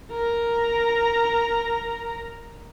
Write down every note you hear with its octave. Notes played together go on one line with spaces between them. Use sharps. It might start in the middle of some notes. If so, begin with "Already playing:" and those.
A#4 A#5